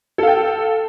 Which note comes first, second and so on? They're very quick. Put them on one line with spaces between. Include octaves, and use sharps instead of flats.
A4 F5 G5